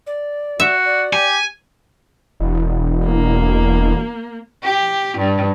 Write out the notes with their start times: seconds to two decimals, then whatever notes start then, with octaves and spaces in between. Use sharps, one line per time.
0.07 D5
0.60 F#4 E5
0.85 D5
1.13 G4 G#5
2.40 E1
3.05 A#3
4.63 G4
5.18 G2